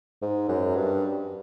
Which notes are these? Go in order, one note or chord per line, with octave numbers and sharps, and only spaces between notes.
G#2
F#2
G2